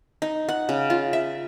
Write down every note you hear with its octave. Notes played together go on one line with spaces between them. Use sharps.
D#4
F#5
C#3
F4
E5